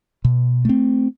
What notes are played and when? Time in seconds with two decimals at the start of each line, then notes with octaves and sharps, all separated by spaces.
0.25 B2
0.65 A3 C4